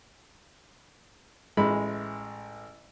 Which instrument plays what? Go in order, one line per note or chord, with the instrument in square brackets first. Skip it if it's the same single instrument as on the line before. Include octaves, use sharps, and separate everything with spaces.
[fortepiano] A1 G#3 B5